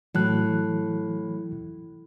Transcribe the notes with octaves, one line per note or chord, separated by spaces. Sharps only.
A2 E3 F#3 F#6